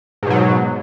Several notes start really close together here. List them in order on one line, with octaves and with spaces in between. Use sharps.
G#2 B2 F#3